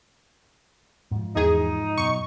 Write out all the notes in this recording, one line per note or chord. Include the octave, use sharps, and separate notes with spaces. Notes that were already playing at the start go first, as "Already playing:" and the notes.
G#2 F3
E2 D#4 G#4
F#2 B2 C#6